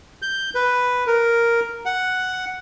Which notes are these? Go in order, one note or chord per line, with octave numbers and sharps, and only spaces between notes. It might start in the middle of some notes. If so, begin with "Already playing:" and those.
G6
B4
A#4
F#5